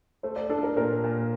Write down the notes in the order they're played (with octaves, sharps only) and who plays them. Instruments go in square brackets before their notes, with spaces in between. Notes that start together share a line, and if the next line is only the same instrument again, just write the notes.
[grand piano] A3 [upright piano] C5
[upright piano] D5
[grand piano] D4 [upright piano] A4
[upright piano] A#4
[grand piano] A#2 [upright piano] A#4
[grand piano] A#2